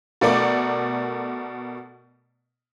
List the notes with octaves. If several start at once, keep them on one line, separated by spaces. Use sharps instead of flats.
B2 A3 A4 A#4 D5 D6